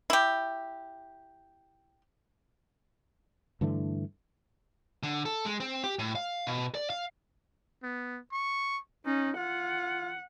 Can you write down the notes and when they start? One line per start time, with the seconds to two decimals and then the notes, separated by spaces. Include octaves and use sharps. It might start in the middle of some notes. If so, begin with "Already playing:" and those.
0.10 E4 G4
3.61 G2 D3 E3 A3
5.03 D3
5.25 A4
5.45 G#3
5.60 C4
5.84 G4
5.99 A2
6.15 F5
6.47 B2
6.75 D5
6.90 F5
7.83 B3
8.32 C#6
9.06 C#4 D#4
9.37 F4 F#5